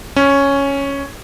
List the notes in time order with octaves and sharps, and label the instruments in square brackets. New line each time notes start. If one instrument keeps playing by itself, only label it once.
[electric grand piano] C#4